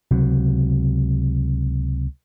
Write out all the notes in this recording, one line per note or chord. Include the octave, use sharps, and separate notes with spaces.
C#2 C3 F#3